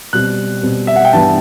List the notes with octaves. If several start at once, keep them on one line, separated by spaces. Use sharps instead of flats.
B2 G3 C4 F#6
B2 G3 C4
E5
F#5
G5
G2 E3 G3 B3 A5